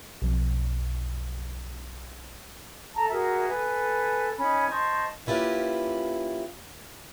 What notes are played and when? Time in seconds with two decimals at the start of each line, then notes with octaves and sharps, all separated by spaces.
0.22 B1 F2
2.94 A4 A5 A#5
3.10 F#4 G#4 A#4 E5
3.48 A4 B4 G#5
4.38 C#4 D#4 B5
4.68 C5 D#5 A5 C#6
5.26 A#3 C#4 E4 F4 G4 B4